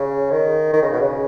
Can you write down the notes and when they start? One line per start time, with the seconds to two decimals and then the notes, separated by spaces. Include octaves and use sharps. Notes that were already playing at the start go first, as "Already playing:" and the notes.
Already playing: C#3
0.31 D#3
0.73 D#3
0.82 C#3
0.92 B2
1.01 C#3